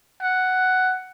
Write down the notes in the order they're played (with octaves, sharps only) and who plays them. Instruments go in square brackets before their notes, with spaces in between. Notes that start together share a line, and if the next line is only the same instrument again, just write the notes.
[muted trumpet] F#5